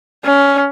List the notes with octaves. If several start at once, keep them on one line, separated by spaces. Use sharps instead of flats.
C#4